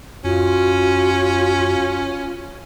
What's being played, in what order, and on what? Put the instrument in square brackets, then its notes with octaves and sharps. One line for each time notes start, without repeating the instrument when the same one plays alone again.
[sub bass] F#2 [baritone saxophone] C#4 [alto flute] F4 [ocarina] F#4